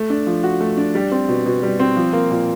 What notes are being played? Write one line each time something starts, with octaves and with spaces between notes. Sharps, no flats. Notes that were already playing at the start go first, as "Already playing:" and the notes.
Already playing: A3
D4
F3
F#4
A3
D4
G3
C4
B2
B2
G3
C4
F3
A#3
A#2